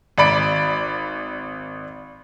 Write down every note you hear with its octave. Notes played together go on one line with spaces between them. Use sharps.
G#1 D5 B5 D7